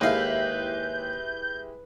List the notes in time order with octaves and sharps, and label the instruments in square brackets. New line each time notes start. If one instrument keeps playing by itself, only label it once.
[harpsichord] D#2 F5 [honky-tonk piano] G#3 E4 G4 [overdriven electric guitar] B4 [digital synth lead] G6